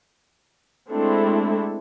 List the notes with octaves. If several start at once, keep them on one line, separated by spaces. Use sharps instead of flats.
G#3 A3 C4 D4 E4 A4